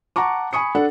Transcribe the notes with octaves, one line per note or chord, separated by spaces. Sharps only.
F#5 A5 A#5 C#6 D6
G#5 B5 C#6 D#6 C#7
D4 A4 F#5